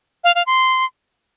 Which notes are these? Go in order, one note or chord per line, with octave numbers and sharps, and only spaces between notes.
F5
F5
C6